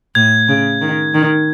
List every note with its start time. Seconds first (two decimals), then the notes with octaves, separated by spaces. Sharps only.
0.15 A2 G#6
0.48 C#3
0.81 D#3
1.14 D#3